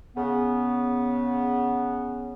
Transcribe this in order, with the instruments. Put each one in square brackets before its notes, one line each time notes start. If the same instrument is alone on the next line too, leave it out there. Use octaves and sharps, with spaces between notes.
[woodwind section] C#3 B3